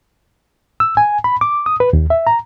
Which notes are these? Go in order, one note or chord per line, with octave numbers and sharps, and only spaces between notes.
E6
G#5
B5
D6
D#6
B4
D#2
E5
A#5